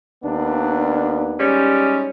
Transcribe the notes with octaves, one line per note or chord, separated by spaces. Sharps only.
D#2 B3 D4
G#2 G3 C#4